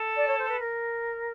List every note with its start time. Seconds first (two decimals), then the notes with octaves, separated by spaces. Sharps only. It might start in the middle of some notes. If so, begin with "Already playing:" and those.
Already playing: A4
0.16 D5
0.26 C#5
0.37 C5
0.47 B4
0.58 A#4